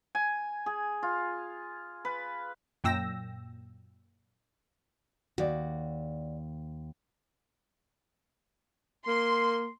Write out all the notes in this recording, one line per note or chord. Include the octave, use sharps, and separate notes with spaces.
G#5
G#4
F4
B4
F#2 A#2 G5 E6 A#6
D#2 F#4 D5
A#3 C6